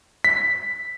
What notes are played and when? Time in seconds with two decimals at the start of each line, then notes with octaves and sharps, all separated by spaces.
0.24 B6